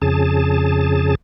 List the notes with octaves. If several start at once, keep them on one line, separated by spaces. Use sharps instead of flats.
F2 C#3 G#4 A5